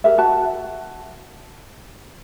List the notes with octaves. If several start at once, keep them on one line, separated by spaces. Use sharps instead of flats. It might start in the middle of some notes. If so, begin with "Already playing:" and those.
G4 A#4 E5
F#4 A5